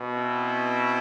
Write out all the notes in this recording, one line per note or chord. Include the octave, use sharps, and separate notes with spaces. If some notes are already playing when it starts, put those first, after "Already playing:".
Already playing: B2
C4 E4